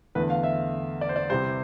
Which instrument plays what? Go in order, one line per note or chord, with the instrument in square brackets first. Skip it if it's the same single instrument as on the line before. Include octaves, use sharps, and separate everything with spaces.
[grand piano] E2 D3 A3 B4
F5
E5
D5
C5
D5
C2 C3 G3 C5